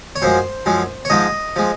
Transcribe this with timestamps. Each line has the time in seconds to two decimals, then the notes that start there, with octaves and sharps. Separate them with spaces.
0.16 C#5
0.22 F#2 F3 G#3 C5
0.66 F#2 F3 G#3
1.05 C#5
1.10 G#2 F3 G#3 D#5
1.56 F3 G#3